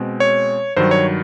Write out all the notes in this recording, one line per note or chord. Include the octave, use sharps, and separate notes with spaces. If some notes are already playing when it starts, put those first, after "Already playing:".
Already playing: B2 G#3 C4
C#5
G2 D#3 F#3 C5
C#5